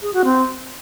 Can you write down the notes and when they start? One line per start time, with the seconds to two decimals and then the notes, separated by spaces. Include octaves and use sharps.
0.02 G#4
0.13 F#4
0.25 C4